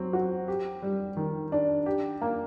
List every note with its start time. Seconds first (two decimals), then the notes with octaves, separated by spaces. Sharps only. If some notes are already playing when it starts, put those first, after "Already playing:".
Already playing: F#3 C4
0.13 F#4
0.48 G4
0.83 G3
1.17 D#3
1.52 D4
1.86 G4
2.21 A#3